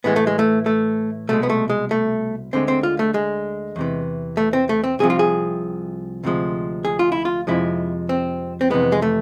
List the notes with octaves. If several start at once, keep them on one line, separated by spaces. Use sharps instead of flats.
A2 E3 G#3 B3
A3
G#3
A3
A3
C2 B2 G#3 A3
B3
A3
G#3
A3
D2 D3 G#3 C4
C4
F4
A3
G#3
E2 C3 E3
A3
C4
A3
C4
C2 C3 F3 G#4
F4
G#4
D2 C3 F3 G#3
G#4
F4
E4
F4
F2 C3 F3 G#3 E4
C4
C4
F2 C3 E3 G#3 B3
G#3
A3